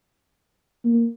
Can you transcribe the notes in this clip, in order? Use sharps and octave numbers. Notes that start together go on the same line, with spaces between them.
A#3